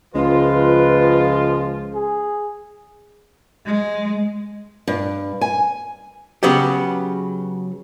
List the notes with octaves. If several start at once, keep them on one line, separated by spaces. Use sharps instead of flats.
C#2 F3 G#3 F4 B4
G#4
G#3
G2
G#5
C#3 F#3 B3 C#4 G4